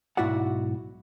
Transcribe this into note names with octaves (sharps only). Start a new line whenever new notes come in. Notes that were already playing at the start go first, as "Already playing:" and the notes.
B1 G#2 E4 F#4 D5 F#5